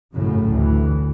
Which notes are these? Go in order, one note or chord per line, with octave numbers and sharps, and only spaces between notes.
A1 F#2 A2 C#3
D2 A2 E3